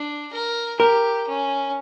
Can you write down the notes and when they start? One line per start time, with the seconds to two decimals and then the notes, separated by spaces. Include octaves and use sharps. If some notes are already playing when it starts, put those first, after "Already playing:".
Already playing: D4
0.33 A#4
0.80 G4 A#4
1.28 C#4